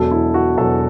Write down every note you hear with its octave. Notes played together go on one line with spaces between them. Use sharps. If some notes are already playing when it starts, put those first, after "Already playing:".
Already playing: E1 E2 B2 F#3 A4
E4
F#4
E1 E2 B2 F#3 A4